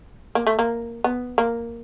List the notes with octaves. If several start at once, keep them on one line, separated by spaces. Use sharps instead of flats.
A#3
A3
A#3
B3
A#3